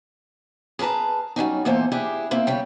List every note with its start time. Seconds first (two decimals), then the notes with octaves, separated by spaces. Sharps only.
0.79 G#4 A#4 B4 A5 A#5
1.36 F#3 G3 C#4 D#4
1.65 E2 A#2 A#3 D#4 A4 C5
1.92 D4 E4 G4 G#4
2.31 A#3 C4 E4
2.47 C#3 G3 G5